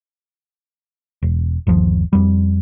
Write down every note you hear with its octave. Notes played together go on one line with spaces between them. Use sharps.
E1
G1 D#2 F3
F2 G3